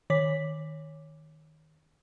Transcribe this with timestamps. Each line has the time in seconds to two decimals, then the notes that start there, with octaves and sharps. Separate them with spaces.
0.10 D#3 C#5 D6 B6